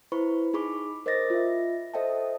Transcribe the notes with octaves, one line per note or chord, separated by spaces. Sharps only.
E4 B4 C5 B5 C#6
D#4 G#4 B5 C#6 D6
A#4 C5 D#5 D6 A6 A#6
F4 E5
A4 C5 D#5 E5 G5 A5